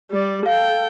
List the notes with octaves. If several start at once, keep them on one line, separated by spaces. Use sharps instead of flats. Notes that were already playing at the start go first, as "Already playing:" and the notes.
G3 D5
A4 F5 G5